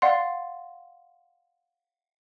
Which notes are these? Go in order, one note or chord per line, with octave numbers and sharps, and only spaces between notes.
D5 F5 F#5 C6